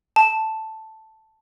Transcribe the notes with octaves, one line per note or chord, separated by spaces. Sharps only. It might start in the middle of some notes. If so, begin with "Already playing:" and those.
A5